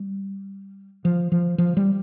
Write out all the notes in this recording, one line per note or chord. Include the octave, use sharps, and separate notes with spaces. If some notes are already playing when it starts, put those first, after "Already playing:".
Already playing: G3
F3
F3
F3
G3